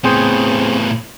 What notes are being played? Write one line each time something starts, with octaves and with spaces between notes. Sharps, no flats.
A2 B3 C4 G#4 C5